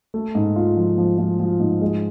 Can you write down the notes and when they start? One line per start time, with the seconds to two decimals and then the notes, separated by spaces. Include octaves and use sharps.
0.14 A3
0.35 G#2
0.56 F4
0.77 F3
0.98 F3
1.18 F3
1.39 F3
1.60 G#2
1.82 G#3